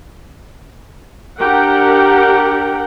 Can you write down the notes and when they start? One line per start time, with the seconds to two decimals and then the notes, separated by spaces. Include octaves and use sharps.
1.39 D4 G4 A#4 F#5 G5